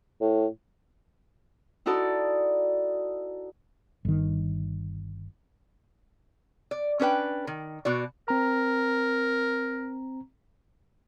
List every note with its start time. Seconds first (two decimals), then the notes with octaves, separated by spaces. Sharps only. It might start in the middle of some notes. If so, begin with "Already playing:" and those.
0.21 A2
1.86 D#4 E4 F#4 A4 D5
4.05 G1 D#3
6.71 D5
7.00 C#4 D4 B4 G5
7.47 D#3
7.85 B2 F#4 D5
8.28 C4 A#4 A#5